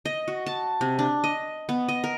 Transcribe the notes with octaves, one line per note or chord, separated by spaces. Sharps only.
D#5
F#4
A5
C3
D4
D#5
B3
D#5
A#4